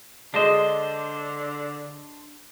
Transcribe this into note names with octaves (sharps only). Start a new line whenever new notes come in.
D3 G#3 D4 C5 D#5